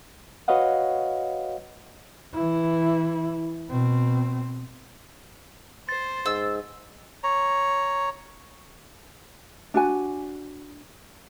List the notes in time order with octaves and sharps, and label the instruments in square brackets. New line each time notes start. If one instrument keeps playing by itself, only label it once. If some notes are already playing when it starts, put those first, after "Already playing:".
[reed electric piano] F#4 B4 C#5 D#5 F5 F#5
[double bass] E3 E4
B2 C4
[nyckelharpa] C5 [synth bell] A6
[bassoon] G#2 [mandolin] E6
[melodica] C#5 A#5
[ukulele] D4 F#4 G#5